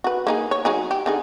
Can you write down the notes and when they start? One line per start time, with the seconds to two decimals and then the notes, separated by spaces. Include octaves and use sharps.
0.04 F#4 B4
0.27 A#3 D#4 G#4
0.51 C#5
0.65 F#3 D#4 G#4
0.91 G4
1.06 D3 D#4 G#4